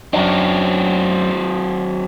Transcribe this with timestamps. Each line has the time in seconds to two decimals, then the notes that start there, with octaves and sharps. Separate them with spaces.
0.13 F#2 F#3 C4 D4